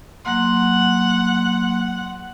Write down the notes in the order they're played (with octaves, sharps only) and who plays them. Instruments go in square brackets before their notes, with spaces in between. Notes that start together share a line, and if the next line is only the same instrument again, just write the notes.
[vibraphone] F#3 A#3 C6 [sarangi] F#5